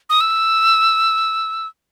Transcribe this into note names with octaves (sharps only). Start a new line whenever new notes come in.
D#6
E6